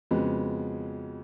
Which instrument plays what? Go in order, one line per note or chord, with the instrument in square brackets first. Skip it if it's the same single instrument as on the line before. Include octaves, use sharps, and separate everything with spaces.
[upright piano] F2 C#3 G#3 B3 F#4